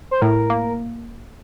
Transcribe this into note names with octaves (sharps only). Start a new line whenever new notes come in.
C5
A2 A#4
A#3